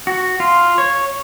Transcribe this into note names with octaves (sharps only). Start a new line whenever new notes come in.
F#4
F4
C#5